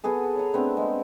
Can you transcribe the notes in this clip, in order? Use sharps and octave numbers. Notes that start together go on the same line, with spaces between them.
B3 F#4 G#4 A4
C#5 A#5
A3 B3 C4 D4
G#3